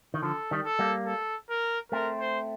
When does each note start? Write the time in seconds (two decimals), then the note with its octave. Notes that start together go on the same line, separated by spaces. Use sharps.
0.14 D#3
0.23 D3 F3 A4
0.51 D#3 G3
0.65 A4
0.79 G3 A#3
1.07 A4
1.50 A#4
1.92 A3 C4 A#4
2.20 C5